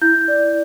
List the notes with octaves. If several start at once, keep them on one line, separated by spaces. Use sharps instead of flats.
E4 G6
D5